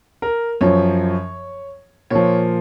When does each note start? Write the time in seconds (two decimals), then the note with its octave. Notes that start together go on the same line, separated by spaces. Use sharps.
0.22 A#4
0.61 F#2 F3 C#5
2.10 A#2 F3 C#5